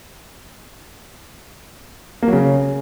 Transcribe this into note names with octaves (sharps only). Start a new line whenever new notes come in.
A#3
F#3
C#3